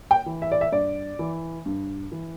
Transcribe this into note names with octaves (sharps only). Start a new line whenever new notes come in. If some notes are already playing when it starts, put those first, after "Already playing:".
G5
E3
E5
D5
E5
G2 D5
E3
G2
E3